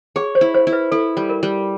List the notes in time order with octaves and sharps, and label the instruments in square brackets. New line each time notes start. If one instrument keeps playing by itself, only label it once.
[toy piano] G#4 [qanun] C#5
[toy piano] C5
[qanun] E4
[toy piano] C5
[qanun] E4
[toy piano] B4
[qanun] E4 [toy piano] A4
[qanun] G3
[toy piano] A#4
[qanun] G3